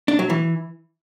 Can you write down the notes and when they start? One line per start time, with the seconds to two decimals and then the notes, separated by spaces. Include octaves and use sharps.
0.08 D4
0.19 F#3
0.30 E3